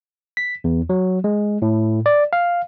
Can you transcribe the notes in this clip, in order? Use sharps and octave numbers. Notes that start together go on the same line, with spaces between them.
B6
E2
F#3
G#3
A2
D5
F5